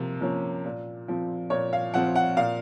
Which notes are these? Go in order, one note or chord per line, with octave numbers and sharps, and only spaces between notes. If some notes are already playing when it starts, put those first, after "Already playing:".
Already playing: C3 F3 A#3
F3 A#3 C#4
A#2
F3 C4
A#2 C#5
F5
F3 C4 F#5
F#5
A#2 F5